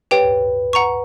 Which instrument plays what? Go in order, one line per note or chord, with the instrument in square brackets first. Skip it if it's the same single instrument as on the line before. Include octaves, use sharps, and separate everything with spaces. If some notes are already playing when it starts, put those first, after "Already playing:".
[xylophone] G4 C#5 G5 [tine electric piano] B4
[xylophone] F#5 A#5 C#6